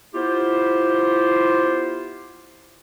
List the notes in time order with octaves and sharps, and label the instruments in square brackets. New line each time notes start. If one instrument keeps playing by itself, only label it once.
[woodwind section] B3 E4 F4 G4 C5